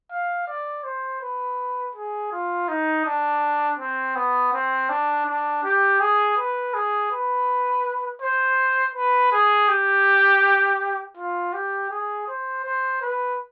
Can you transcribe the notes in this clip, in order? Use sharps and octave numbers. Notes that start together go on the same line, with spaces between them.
F5
D5
C5
B4
G#4
F4
D#4
D4
C4
B3
C4
D4
D4
G4
G#4
B4
G#4
B4
C5
B4
G#4
G4
F4
G4
G#4
C5
C5
B4